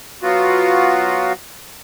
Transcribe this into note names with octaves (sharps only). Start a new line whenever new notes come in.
F#3 B3 F4 F#4